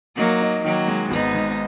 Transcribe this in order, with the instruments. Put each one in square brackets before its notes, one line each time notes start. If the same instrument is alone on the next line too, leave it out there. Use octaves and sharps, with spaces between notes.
[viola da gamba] F#3 A#3 [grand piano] D#4
[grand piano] D#4
[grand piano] D#3 [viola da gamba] F#3 A#3
[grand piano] G#3
[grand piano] G#1 [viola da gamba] B3 D#4
[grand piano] G#2